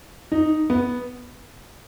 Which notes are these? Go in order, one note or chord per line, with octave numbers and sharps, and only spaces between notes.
D#4
B3